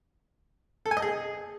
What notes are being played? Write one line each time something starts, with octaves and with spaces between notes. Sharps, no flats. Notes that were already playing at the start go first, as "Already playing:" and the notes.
A4
G#5
D#5
G#4